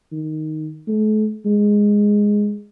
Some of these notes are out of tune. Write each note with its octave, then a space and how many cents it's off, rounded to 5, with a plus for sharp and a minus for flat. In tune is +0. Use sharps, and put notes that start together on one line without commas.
D#3 +0
A3 -40
G#3 -5